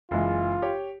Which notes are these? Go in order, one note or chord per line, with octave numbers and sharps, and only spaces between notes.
F#1 E3 G#3 F4
G4 C#5